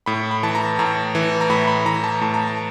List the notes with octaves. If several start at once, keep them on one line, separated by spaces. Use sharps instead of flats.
A2 B5
B5
E3 A5
A#5
A2 A#5
E3
A#5
A2 B5
B5
E3 A#5
A5
A2 A5
A#5
A5